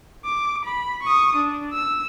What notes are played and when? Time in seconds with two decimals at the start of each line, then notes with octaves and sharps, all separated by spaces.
0.26 D6
0.65 B5
1.03 C#6 D#6
1.36 D4
1.73 E6